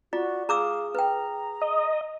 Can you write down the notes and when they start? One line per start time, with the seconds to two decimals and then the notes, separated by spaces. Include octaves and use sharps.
0.13 F4 F#4 D5
0.49 G#4 F5 A#5 D6 E6
0.95 B4 G5 A#5
1.62 D#5